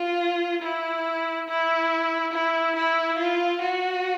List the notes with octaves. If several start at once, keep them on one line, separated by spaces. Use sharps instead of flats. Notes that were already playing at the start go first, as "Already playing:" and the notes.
Already playing: F4
E4
E4
E4
E4
F4
F#4